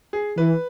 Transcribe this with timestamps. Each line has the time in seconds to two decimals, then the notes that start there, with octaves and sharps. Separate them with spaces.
0.13 G#4
0.38 E3 B4